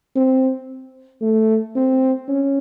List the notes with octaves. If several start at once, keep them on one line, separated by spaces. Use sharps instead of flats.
C4
A3
C4
C#4